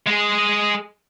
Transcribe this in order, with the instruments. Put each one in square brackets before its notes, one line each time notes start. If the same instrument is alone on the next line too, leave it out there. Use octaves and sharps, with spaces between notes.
[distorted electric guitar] G#3 G#4